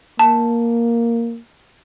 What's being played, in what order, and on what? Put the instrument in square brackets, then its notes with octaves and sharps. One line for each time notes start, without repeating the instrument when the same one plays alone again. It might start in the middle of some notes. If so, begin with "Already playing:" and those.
[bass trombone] A#3 [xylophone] A5